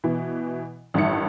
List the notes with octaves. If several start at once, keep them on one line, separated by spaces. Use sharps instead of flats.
B2 E3
A1 G2 D#3 E5 C#7